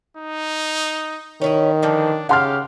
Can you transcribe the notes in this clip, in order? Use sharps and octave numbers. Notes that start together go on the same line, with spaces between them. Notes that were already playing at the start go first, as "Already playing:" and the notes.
D#4
D#3 C#4 E4 D#5
D3 E3 F3 D4
C#3 G4 F5 F#5 C6 F6